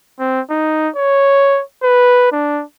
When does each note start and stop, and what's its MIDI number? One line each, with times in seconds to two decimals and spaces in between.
0.19 0.41 60
0.50 0.89 63
0.96 1.61 73
1.83 2.32 71
2.32 2.62 62